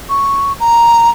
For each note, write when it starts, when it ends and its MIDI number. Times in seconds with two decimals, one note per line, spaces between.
0.09 0.52 85
0.60 1.09 82